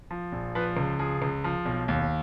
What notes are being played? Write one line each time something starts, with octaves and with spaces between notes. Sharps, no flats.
F3
A#1
F3 B4
C#2
F3 G#4
C#2
F3
B1
D#2